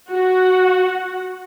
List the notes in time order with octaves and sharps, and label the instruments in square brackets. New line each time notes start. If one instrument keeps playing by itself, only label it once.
[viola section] F#4 F#5